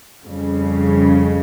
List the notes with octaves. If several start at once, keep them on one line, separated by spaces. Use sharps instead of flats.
F2 C#3 G3